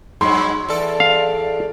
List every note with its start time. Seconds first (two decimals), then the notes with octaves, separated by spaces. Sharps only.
0.21 G2 F#3 G#3 B5 C6
0.69 E2 A4 D5
1.00 F5